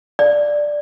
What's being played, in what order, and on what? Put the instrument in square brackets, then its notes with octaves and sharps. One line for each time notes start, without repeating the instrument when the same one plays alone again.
[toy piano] D5